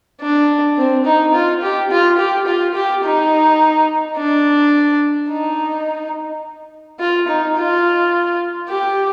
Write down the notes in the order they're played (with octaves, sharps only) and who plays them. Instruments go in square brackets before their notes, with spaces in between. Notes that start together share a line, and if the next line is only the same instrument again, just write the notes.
[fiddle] D4
C4
D#4
F4
G4
F4
G4
F4
G4
D#4
D4
D#4
F4
D#4
F4
G4